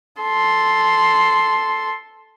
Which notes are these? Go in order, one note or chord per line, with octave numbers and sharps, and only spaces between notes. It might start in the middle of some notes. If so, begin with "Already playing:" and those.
A4 C6